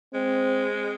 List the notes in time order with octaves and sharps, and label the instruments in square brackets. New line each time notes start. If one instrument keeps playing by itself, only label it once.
[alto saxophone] G#3 [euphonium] C4